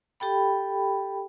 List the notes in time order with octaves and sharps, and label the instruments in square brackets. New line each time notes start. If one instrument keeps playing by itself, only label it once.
[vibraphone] G4 A4 G5 B5